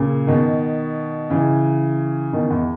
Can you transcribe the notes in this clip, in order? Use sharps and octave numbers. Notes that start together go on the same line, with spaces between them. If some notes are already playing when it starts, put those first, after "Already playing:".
Already playing: A#2 C#3
B2 D#3
C#3 E3
B2 D#3
E2